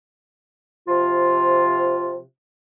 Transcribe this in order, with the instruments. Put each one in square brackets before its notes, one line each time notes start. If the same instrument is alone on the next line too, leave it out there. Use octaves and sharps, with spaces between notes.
[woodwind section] C3 F3 F4